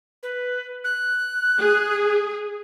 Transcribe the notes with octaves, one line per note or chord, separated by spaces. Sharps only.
B4
F#6
G#4